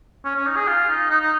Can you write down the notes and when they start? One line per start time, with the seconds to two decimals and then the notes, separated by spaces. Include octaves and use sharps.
0.25 C#4
0.35 C#4
0.47 D#4
0.56 G#4
0.68 F4
0.89 D#4
1.10 D#4
1.21 D#4